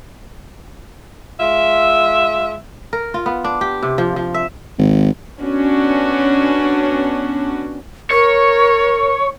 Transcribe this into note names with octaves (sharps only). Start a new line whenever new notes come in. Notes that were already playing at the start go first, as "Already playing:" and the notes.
G#3 F4 E5
A#4
F4
B3
D4
G4
C3
F3
F3
E5
G#1
B3 C#4 D4 F#4
A#4 C#5